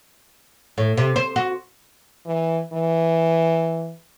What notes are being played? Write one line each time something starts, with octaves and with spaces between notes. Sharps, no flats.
A2
C3
C5
F#4
E3
E3